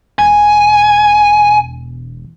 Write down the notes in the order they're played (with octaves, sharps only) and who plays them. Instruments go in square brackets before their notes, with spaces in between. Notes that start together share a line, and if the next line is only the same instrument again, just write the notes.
[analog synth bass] E1 [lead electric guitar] G#5